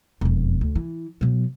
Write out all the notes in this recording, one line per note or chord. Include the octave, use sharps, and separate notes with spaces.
E1 F2
D2
E3
B2 F#3